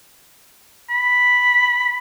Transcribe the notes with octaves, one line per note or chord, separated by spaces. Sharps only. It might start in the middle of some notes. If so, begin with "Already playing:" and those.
B5